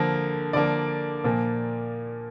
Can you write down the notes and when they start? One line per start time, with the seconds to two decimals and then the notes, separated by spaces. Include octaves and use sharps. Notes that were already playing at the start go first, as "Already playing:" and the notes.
Already playing: D3 F3 A#3
0.53 D3 F3 A#3 D5
1.24 A#2 F3 A#3